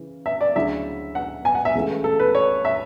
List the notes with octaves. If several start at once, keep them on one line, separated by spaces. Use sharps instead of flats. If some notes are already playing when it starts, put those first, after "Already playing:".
Already playing: C#3 E3
E5
D5
D2 C#3 F#3 C#4 E4 E5
F#5
G#5
F#5
E5
C#2 C#3 E3 A3
A4
B4
C#5
E5